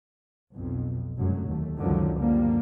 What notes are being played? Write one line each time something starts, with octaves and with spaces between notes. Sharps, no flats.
B1 F2
F1 F#2 D3 F#3 G#3
D#2 A3
C#2 F#2 D3 D#3 F3 F#3
F#2 D3 F3 G3 A#3